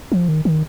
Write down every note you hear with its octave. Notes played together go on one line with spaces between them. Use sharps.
F3
D#3
D#3